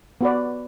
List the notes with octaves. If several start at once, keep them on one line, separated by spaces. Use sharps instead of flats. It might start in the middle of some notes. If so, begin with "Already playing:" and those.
B3 F#4 B4 D5